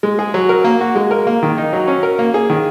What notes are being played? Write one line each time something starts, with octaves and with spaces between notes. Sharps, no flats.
G#3
G#4
F#3
A#4
A#3
F#4
G#3
A#4
A#3
D#3
D#4
F#3
C#4
A#4
A#3
G#4
D#3